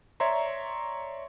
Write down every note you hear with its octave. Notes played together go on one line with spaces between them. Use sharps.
C#5 D5 E5 A#5 C6